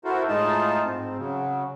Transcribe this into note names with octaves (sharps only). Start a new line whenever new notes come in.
E4 F#4 A4 A#4 C5
A2 G#3 D#4 F4 A5
G#2 C4
C#3 F#3